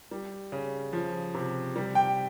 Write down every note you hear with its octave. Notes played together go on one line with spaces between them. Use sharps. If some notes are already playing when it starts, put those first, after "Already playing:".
G3
C#3
F3
C3
G3
G5